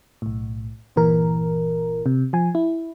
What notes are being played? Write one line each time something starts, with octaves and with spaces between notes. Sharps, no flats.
B1 A2
G1 A#2 E3 A#4
C3
F3 G#5
E4